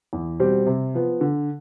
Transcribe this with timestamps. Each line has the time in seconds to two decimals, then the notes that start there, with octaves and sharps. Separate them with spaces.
0.13 E2
0.40 B2 G3 C4 G4
0.67 C3
0.94 F3 B3
1.21 D3